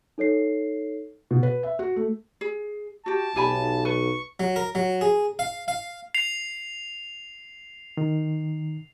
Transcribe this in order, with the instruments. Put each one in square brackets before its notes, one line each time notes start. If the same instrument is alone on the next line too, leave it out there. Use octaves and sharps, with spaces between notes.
[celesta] D#4 A4 C#5 C7
[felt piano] B2
B4
E5
F#4
A3
[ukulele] G#4
[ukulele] F#4 G4 [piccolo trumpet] A5
[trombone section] B1 [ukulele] G4 G#5 B5
[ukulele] B4 [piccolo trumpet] C#6
[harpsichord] F#3
A#4
F#3
G#4
F5
F5
[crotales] C7 F7
[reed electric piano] D#3